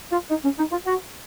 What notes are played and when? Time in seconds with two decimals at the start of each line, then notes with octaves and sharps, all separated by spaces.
0.12 F4
0.30 D#4
0.44 C#4
0.58 D#4
0.72 F4
0.86 F#4